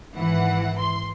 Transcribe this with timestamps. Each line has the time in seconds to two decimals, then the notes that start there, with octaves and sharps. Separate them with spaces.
0.17 G#1 E3 F#5
0.79 C6